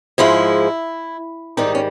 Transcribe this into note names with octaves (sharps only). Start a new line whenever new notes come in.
G#2 F3 G#3 E4
G#2 D#3 G3 D#4
C#4